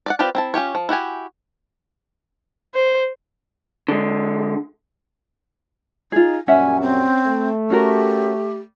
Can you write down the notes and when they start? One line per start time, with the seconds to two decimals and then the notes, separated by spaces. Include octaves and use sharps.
0.06 D5 D#5 F#5
0.19 C4 F4 G4 B4 D5
0.35 C4 E4 A5
0.54 C#4 F4 G4 C#5
0.75 F3
0.89 E4 F#4 G4 G#5
2.75 C5
3.88 D3 G#3
6.12 D#4 F4 G#4
6.48 F#2 A#2 G3 C#4 E5 F#5 G#5
6.81 C4
7.27 A3
7.70 C#4 F#4 G4 A#4